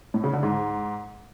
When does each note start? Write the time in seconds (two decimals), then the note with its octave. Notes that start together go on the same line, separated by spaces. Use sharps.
0.14 A2
0.24 C#3
0.33 D3
0.43 G#2